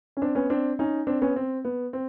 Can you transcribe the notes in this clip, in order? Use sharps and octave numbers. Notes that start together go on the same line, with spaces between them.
C#4
C4 D4
B3 C#4
C4 D4
C#4 D#4
C4 D4
B3 C#4
C4
B3
C4